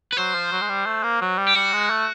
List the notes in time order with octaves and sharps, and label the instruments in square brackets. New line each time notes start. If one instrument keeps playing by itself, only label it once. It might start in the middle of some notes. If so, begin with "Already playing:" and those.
[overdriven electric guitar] B4
[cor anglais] F#3 [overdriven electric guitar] C5
[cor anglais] F3
F#3
G#3
G3
A3
A#3
F#3
G3
[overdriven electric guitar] G4
[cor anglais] G3 [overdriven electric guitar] F#4
[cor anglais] G#3
A3